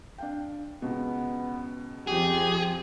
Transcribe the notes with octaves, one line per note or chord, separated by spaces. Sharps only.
D4 F5 G5
C#2 B2 B3
F2 F3 G4 G#4